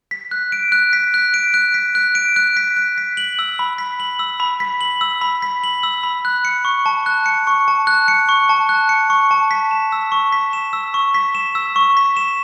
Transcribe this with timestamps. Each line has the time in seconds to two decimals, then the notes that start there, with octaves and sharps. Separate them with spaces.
0.11 B6
0.31 F#6
0.52 D7
0.72 F#6
0.93 B6
1.14 F#6
1.34 D7
1.54 F#6
1.74 B6
1.95 F#6
2.15 D7
2.36 F#6
2.57 B6
2.76 F#6
2.98 B6
3.17 F#7
3.39 E6
3.59 B5
3.78 B6
4.00 F#7
4.19 E6
4.40 B5
4.60 B6
4.81 F#7
5.01 E6
5.21 B5
5.42 B6
5.64 F#7
5.83 E6
6.03 B5
6.25 F#6
6.45 C#7
6.65 C#6
6.86 A5
7.06 F#6
7.26 C#7
7.47 C#6
7.68 A5
7.87 F#6
8.08 C#7
8.29 C#6
8.49 A5
8.69 F#6
8.89 C#7
9.10 C#6
9.31 A5
9.51 B6
9.71 E7
9.92 E6
10.12 C#6
10.32 B6
10.53 E7
10.73 E6
10.94 C#6
11.14 B6
11.35 E7
11.55 E6
11.76 C#6
11.97 B6
12.17 E7